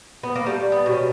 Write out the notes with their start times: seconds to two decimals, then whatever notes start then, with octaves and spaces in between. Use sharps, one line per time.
0.23 B3
0.35 A#3
0.46 G3 A3
0.72 B3
0.86 B2
0.92 C#4